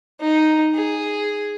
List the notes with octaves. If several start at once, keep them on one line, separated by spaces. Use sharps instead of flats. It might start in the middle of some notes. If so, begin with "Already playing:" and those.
D#4
G#4